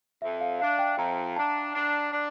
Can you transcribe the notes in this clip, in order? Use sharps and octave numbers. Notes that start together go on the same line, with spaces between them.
F2 E5
F5
D4 F5
G5
F2 A#5
D4 A5
D4
D4